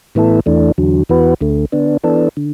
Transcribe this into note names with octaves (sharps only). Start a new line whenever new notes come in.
A2 E3 B3 E4 A4
E2 E3 A3 D4
E2 D3 F#3
E2 E3 B3 F#4 B4
D2 D3 A3
D3 B3 D4
E3 B3 D4 A4
D3